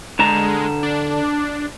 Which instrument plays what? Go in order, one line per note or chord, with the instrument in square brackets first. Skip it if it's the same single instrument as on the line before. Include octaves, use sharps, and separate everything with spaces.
[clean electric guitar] D3 A5 A#5 [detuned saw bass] G#3
[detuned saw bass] D4